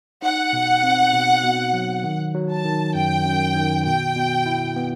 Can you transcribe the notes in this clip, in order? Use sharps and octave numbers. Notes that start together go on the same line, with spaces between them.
D#4 F#5
B2
C4
B2
B2
F#3
D#3
F#3
A5
D#3
F#2 G5
F#2
D#3
B2 G5
B2
E4
B3